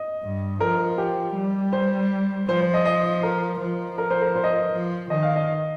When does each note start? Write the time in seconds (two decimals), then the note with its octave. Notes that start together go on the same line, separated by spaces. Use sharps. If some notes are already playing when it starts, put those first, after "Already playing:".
Already playing: D#5
0.23 G2
0.60 F3 A#4
0.98 G4
1.35 G3
1.73 C5
2.48 F3 C5
2.61 C5
2.74 D#5
2.85 D#5
3.23 A#4
3.61 F3
3.98 A#4
4.10 C5
4.22 A#4
4.36 C5
4.44 D#5
4.51 C5
4.72 F3
5.10 D#3 D#5
5.23 F5
5.36 D#5